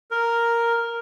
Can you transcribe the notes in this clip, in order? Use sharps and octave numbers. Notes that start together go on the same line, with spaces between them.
A#4